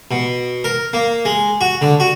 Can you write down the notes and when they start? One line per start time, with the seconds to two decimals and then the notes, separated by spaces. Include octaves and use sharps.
0.11 B2
0.64 A#4
0.93 A#3
1.25 G#3
1.61 F#4
1.81 D3
2.00 F#4